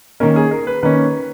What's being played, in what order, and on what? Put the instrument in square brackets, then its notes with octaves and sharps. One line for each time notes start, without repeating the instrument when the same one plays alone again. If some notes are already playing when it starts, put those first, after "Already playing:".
[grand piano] D#3 A#3 C#4 A#4
G#4
A#4
B4
D#3 A#3 C#4 B4